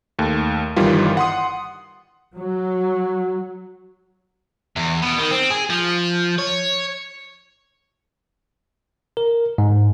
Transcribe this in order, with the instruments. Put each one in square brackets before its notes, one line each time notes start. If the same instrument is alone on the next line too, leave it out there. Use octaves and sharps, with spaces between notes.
[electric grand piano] D#2 A3
G1 D#3 E3 G3 F4
F#5 C6 D#6
[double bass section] F#3
[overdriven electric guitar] E2
B2
D#3
C4
G#4
F3
C#5
[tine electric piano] A#4
G#2